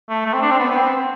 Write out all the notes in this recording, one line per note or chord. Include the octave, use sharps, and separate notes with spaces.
A3
A3
C4
D4
C4
B3
B3
C4